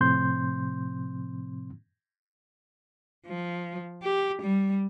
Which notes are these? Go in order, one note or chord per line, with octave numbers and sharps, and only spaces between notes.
A2 C3 F3 C4 C6 G6
F3
G4
G3